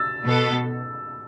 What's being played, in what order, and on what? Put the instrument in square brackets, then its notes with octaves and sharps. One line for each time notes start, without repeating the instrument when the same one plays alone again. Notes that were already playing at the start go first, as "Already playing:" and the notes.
Already playing: [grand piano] E6 A6
[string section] B2 B3 A4